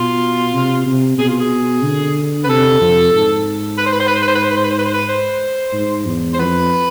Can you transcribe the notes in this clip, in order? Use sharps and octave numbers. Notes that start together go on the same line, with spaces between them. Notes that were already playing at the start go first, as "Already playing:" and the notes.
Already playing: B2 F4
C3
C3
B2 G#4
F4
G#4
D3
B4
C3 A4
F2
G#2
B4
C5
B4
C5
B4
C5
B4
C5
B4
C5
B4
C5
B4
C5
B4
C5
B4
C5
G#2
E2
C5
F2 B4